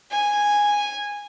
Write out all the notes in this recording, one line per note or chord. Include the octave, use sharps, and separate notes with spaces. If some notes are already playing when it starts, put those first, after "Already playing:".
G#5